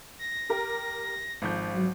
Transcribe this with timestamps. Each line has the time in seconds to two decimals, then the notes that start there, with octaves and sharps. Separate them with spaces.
0.19 A#6
0.50 G4 A#4
1.42 G#1 F3 G6
1.74 F#3